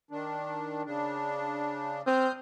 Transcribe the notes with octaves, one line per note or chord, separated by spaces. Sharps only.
D#3 D4
C#3 D4
C4 D#6 F6 G6